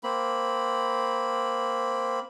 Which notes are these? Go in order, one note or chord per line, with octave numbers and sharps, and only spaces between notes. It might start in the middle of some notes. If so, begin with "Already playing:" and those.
A#3 C4 B5